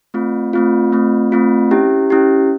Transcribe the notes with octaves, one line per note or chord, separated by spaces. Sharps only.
A3 C4 F4
A3 C4 F4
A3 C4 F4
A3 C4 F4
C#4 E4 G4
C#4 E4 G4